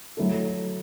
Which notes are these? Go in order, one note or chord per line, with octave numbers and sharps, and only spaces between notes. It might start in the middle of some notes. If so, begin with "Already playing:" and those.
F#3 A3 E4 A4